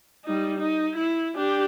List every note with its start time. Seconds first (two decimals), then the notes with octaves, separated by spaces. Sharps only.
0.25 G3 D#4
0.58 D#4
0.96 E4
1.36 D4 G4